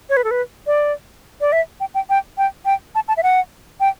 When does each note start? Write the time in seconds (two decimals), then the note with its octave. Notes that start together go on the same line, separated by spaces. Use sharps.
0.09 C#5
0.17 B4
0.24 A4
0.31 B4
0.67 D5
1.41 D5
1.52 E5
1.80 G5
1.95 G5
2.10 G5
2.38 G5
2.65 G5
2.95 A5
3.08 A5
3.17 E5
3.23 F#5
3.80 G5